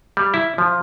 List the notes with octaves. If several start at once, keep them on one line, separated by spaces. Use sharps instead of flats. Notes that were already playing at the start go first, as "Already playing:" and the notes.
G3
E4
F3